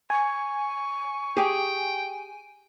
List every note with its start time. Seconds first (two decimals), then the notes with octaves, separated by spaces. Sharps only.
0.10 G#5 C#6
1.37 G4 G#4 G5